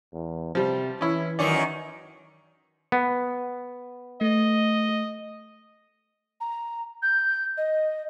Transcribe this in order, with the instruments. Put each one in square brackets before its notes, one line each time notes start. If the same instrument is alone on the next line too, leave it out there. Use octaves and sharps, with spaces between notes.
[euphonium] E2
[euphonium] C3 [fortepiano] F3 G3
[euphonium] E3 [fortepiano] C#4 E4
[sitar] F#2 D#3 C#4 [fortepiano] D5
[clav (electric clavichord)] B3
[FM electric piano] A3 [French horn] D#5
[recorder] A#5
G6
D#5